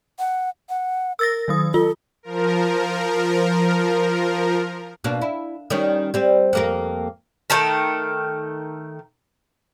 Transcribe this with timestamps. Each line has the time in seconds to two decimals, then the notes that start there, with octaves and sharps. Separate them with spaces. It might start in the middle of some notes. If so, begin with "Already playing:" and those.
0.19 F#5
0.70 F#5
1.19 A#4 E6 A6 A#6
1.48 D#3 F#3 D#6
1.74 F4 A4
2.23 F3 A#4
5.04 B2 A#3 D4
5.21 E4
5.70 D#3 G3 C#4
6.14 G3 C4
6.53 F2 A#3 A#4
7.50 D#3 A3 A4 A#4